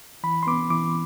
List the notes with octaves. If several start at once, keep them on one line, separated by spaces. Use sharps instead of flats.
E3 B5
C6
B3 D6
E3 D6